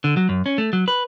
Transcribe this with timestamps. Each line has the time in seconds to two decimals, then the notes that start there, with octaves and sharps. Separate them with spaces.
0.04 D3
0.17 F#3
0.29 F#2
0.46 C#4
0.58 A3
0.73 F#3
0.88 B4